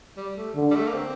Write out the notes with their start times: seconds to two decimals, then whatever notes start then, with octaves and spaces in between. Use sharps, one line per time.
0.17 G3
0.37 A3
0.56 D3
0.71 G3
0.75 A3
0.87 A#3
0.94 C4